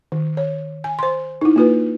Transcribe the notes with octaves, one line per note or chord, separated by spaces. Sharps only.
D#3
C#5
G#5
C5 C6
D#4 E4
A#3 F4 B4